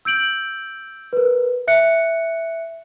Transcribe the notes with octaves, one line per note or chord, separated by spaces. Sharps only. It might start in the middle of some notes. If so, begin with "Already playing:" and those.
E6 G6 D7 F#7
A#4 B4
E5 F#6 C#7